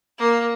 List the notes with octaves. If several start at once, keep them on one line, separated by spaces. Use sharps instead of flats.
A#3